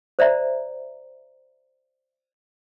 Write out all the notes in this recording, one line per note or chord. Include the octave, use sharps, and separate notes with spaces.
C5 D5 E5 A#5